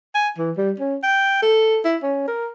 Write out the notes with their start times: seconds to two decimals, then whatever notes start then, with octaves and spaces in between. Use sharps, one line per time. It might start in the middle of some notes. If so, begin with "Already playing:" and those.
0.15 G#5
0.38 E3
0.57 G3
0.80 C#4
1.03 G5
1.42 A4
1.84 E4
2.03 C#4
2.28 A#4